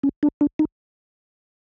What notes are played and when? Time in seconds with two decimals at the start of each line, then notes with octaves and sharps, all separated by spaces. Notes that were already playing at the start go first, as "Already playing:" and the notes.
0.03 C#4
0.23 D4
0.41 D4
0.59 D#4